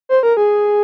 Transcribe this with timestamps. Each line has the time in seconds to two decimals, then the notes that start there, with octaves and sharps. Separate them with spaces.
0.09 C5
0.23 A#4
0.37 G#4